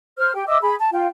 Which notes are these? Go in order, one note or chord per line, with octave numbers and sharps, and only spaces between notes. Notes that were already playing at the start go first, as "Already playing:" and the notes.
C5 F6
G4 G5
D#5 E5 D6 E6
G#4 B5
A5
F4 G5